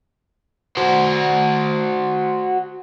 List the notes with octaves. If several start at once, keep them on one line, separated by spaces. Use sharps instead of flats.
F#4 C5